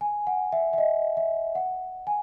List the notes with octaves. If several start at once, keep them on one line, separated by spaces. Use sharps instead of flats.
G#5
F#5
E5
E5
D#5
E5
F#5
G#5